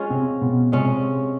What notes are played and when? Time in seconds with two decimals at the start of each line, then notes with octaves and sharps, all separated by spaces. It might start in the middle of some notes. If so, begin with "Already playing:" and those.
Already playing: G#3 C#4 F4
0.10 C3 C4
0.41 B2 B3
0.72 C3 G#3 C4 C#4 F4